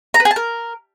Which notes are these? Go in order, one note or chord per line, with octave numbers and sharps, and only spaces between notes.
A#5
B4
G#4
A5
A#4